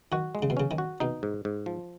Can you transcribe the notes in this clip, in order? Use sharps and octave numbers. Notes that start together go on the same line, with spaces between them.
D#3 F#4
G#3
C#3
B2
C#3 C#4
D#3
F#4
B2 D#4
G#2
G#2
F3